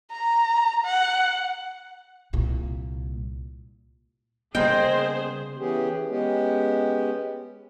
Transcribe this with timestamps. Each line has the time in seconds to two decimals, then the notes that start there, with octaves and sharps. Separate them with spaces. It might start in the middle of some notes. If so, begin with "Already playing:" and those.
0.12 A#5
0.85 F#5
2.33 C2 A#2
4.55 C#3 G3 A#3 B3 G#4 C5 D#5 G5
5.58 E3 B3 C#4 G4 G#4
6.08 G#3 B3 C#4 G4